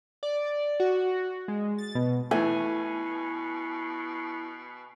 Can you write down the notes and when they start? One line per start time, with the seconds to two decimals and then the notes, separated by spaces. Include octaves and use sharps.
0.23 D5
0.80 F#4
1.48 G#3
1.78 A6
1.95 B2
2.31 B2 E3 A3 E4 G#5